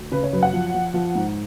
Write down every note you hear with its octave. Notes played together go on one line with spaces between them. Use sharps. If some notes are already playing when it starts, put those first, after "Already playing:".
Already playing: D2
C#3 B4
C#5
F#2 B4
F#5
F3
F3
F3
G#2